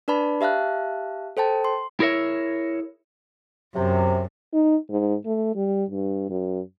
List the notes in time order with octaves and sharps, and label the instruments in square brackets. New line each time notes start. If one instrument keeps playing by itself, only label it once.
[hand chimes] D4 B4 D5 A5 B5
G4 E5 F5 A5 F#6
A4 C5 G5 A5
C6
[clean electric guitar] E4 G#4 A#4 C#5 E5
[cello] F#2 [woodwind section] C3
[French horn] D#4
G#2
A3
G3
G2
F#2